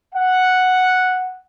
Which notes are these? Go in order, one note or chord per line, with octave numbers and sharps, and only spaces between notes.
F#5